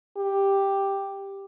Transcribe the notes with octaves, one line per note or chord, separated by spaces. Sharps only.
G4